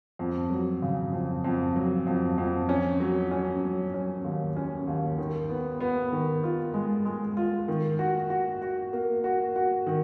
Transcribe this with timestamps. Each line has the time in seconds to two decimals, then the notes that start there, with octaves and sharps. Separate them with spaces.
0.19 F2
0.50 F#3
0.82 C#3
1.13 F2
1.44 F2
1.76 F#3
2.07 F2
2.38 F2
2.69 C#4
3.00 F#3
3.31 C#4
3.63 F#3
3.94 C#4
4.24 D#2
4.57 C#4
4.87 D#2
5.18 D#3
5.49 B3
5.80 B3
6.12 D#3
6.44 F4
6.74 G#3
7.05 G#3
7.37 F4
7.68 D#3
7.99 F#4
8.30 F#4
8.62 F#4
8.93 A#3
9.24 F#4
9.56 F#4
9.87 D#3